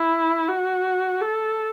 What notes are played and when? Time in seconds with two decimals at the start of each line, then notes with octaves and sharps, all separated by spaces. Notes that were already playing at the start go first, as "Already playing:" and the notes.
Already playing: E4
0.48 F#4
1.21 A4